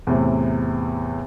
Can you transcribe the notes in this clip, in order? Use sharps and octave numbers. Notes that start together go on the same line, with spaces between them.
E2 A2 C3